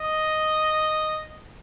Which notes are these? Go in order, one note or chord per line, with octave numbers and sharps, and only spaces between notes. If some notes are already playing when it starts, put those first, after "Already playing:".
Already playing: D#5